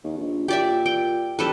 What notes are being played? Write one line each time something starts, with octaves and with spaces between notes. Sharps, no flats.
D#2
A#1
A#2 G4 D5 E5
G5
D1 G3 A4 B4